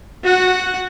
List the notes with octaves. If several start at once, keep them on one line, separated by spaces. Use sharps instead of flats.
F#4 F#5